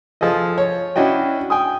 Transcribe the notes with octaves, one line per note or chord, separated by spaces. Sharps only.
F3 G#4 A4 D#5
C#5
C#4 D4 E4 F#4 D#5 G5
G5 G#5 D#6